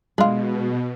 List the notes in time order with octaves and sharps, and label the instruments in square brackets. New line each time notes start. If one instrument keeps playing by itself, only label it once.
[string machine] B2 [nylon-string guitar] G#3 [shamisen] D4 F4